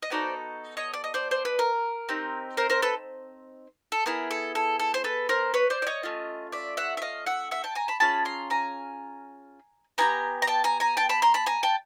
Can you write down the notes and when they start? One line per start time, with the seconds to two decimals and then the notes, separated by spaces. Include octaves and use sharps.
0.02 D#5
0.10 B3 D#4 F#4 A4 C5 D5
0.77 C#5 D#5
0.94 D5
1.04 D#5
1.14 C5 D5
1.31 C5
1.45 B4
1.59 A#4
2.09 C4 D#4 G4
2.57 A#4 C5
2.70 A#4 C5
2.82 A4 B4
3.92 A4
4.06 B3 E4 G#4 A#4
4.31 A4
4.55 A4
4.79 A4
4.94 C5
5.04 A4 B4
5.29 A#4 C5
5.54 B4 C#5
5.70 C5 D5
5.82 D5
5.87 C#5 D#5
6.03 A3 C#4 F4
6.52 D5 E5
6.77 E5 F#5
6.97 E5
7.02 D#5 F5
7.26 E5 F#5
7.51 E5 F#5
7.64 G5 A5
7.75 G#5 A#5
7.88 A5 B5
8.00 C#4 F4 G#4 A5 B5
8.25 A#5 C6
8.50 G#5 A#5
9.98 B3 E4 G4 G#5 A#5
10.42 A#5
10.47 G5 A5
10.64 G#5 A#5
10.80 G#5 A#5
10.97 G5 A5
11.09 A5 B5
11.22 A#5 C6
11.34 A5 B5
11.46 G#5 A#5
11.63 G5 A5